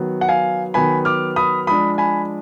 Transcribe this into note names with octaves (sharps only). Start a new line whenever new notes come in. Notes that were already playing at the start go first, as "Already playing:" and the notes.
Already playing: D#3 F#3 B3
F#5
F5 G#5
D#3 F#3 B3 G#5 B5
D6 F6
B5 D#6
F3 G#3 D4 B5 D#6
G#5 B5